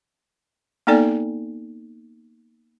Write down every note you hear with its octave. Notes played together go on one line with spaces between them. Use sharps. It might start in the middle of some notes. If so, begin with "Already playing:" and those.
A#3 B3 D#4 A4 D5 G#5